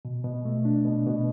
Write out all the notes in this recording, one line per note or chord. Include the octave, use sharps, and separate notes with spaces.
B2
B2
A3
D4
B2
B2